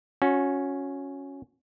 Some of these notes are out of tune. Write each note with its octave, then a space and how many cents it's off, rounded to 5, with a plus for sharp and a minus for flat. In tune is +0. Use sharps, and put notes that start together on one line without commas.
C#4 +0 F#4 -25